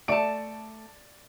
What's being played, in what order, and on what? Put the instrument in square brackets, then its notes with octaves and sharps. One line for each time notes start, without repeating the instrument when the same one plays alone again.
[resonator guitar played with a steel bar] A3 A5 [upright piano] D5 D7